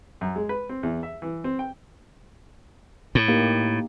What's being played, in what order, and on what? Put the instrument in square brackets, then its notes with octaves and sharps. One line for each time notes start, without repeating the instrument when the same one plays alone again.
[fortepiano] F#2
G#3
B4
C4
E2
E5
E3
C4
G5
[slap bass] A2
[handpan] A#3 D#4 G4